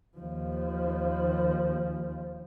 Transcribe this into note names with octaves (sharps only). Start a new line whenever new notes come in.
D#2 F3